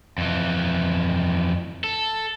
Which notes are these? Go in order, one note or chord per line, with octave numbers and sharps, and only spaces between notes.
F2 E3
A4